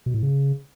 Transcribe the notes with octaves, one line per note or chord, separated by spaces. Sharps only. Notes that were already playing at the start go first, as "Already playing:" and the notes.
B2
A2
C#3